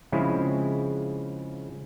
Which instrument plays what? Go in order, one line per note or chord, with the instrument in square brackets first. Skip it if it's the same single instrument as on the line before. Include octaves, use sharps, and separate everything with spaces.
[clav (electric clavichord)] C#3 F3 G#3 C4 E4